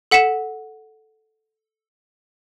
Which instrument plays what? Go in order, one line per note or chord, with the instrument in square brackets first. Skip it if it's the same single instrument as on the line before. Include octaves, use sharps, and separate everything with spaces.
[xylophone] A4 F#5 B6 C#7 E7